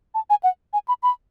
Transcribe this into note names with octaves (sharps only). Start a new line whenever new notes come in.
A5
G#5
F#5
G#5
B5
B5